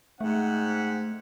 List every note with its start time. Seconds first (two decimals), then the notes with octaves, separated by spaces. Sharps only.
0.21 G#2 A3 C4 F#5